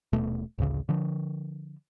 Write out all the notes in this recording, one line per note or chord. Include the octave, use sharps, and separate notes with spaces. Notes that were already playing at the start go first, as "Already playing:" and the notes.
D#1 B2 A3
A1 D2 C#3
D3 F3